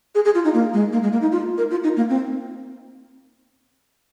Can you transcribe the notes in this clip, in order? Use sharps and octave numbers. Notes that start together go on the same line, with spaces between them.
G#4
G#4
F4
D#4
A#3
G#3
A#3
G#3
A#3
D#4
F4
A#4
F4
D#4
A#3
C4